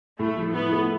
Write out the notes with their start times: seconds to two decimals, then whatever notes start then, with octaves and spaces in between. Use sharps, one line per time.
0.19 A2 A3
0.37 F3
0.54 B3 E4
0.72 A3